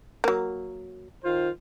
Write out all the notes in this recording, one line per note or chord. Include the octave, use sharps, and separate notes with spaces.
F#3 A#3
D#3 F4 C5